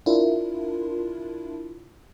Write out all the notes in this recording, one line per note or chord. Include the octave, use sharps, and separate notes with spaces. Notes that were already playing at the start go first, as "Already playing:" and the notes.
D4 E4 F4 A#4